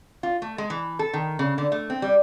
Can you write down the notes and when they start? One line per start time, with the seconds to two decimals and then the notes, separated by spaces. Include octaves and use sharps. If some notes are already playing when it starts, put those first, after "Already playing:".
0.23 F4
0.42 A3
0.58 G#3
0.70 E3
0.99 A4
1.13 D#3
1.39 C#3
1.58 D3
1.72 A3
1.90 C4
2.02 G3